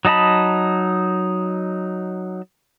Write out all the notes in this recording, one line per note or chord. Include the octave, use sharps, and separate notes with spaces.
F#3 D#4 D#5 A5 B5